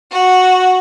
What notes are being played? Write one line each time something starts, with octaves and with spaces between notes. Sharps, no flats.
F#4